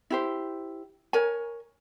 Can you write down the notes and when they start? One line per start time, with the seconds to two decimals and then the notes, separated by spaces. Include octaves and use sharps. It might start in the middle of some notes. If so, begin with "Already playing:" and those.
0.10 E4 G4 C5
1.13 A#4 C#5 G#5